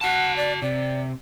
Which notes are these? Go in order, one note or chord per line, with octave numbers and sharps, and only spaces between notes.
F#4 F#5 A5
D5
C3 D5